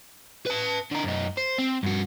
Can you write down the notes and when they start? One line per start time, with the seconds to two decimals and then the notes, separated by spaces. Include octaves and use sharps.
0.46 B4 A5
0.91 D3 A#4
1.04 F#2 D#4
1.38 C5
1.59 C4
1.83 G2 F#4